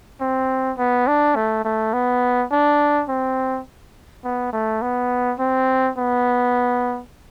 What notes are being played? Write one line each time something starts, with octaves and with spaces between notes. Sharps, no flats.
C4
B3
D4
A3
A3
B3
D4
C4
B3
A3
B3
C4
B3